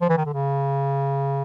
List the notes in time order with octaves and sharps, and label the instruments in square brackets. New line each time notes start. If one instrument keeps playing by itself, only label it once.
[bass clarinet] F3
E3
D#3
D3
C#3